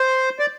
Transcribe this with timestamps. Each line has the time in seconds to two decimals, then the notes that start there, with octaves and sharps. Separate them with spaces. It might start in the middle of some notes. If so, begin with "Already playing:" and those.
Already playing: C5
0.39 D5